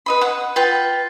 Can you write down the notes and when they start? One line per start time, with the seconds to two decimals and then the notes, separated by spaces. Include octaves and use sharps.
0.06 B4 D#5 B5
0.21 F#5
0.56 F4 B4 G5 B5